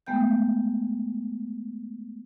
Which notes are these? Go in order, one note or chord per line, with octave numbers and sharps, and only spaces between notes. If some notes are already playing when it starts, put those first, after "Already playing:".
G#3 A3 B3 G5 G6